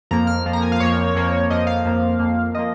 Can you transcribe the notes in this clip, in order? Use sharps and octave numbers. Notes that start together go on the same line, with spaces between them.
F2 F3 A#3 A#5
F6
F2 F3 A#3
A#5
G#5
F5
F2 F3 A#3 C#5
F2 F3 A#3
F2 F3 A#3 D#5
F5
F2 F3 A#3
F2 F3 A#3
F3 A#3 D#5